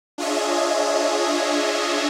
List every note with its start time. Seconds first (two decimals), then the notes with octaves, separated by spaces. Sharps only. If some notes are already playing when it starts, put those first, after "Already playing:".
0.18 D4 F4 G#4 C#5 D#5 E5